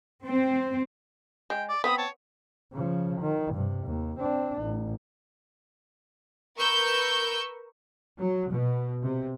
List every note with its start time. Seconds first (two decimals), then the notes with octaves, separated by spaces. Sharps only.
0.24 C4
1.50 G#3 G5
1.69 D5 D6
1.84 B3 C4 B5 D#6
1.98 C#5 A5
2.73 C#3 F3
3.21 D#3
3.55 G2 C3
3.85 D#2
4.20 C4 D4
4.62 A1
6.58 A#4 B4 C#6 E6 G6
8.18 F#3
8.52 B2
9.03 C3